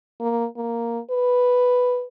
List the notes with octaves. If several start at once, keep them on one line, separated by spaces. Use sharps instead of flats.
A#3
A#3
B4